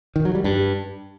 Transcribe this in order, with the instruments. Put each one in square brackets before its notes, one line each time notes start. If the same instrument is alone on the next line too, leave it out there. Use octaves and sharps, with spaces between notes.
[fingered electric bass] D#3
F#3
G3
G2